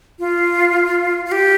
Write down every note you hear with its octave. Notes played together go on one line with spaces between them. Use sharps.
F4
F4
G4